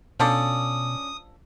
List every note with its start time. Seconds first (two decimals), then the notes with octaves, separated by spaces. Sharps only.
0.20 B2 F3 C#4 D4 A4 D5 D#6